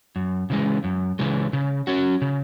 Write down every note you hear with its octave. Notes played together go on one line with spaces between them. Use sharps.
F#2
C#3 E3 G#3
F#2
C#3 E3 G#3
C#3
F#3 C#4 F#4
C#3